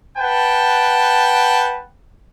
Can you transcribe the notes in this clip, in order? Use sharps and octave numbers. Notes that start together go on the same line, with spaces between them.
B4 F#5 G5 A5